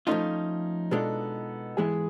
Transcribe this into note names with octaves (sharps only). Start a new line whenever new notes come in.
F3 A3 C#4 D#4 F4
B2 G#3 B3 D4 F4 A4
G#2 E3 G#3 B3 E4 G#4